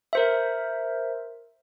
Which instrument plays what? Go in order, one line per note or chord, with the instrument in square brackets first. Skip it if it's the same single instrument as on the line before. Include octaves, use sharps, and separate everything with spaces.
[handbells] A#4 C5 E5